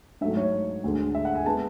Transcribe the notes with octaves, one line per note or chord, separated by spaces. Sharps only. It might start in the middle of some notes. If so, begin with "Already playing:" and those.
G#2 F#3 A3 E5
C#5
D2 D3 G#3
E5
F#5
G#5
G#3 B3 A5